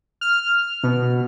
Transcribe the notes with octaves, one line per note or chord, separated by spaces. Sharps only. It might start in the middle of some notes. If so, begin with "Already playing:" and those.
F6
B2